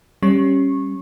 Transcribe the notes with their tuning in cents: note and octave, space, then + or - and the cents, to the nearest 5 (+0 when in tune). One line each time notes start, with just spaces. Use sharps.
G3 +0 C#4 -15 C#6 -20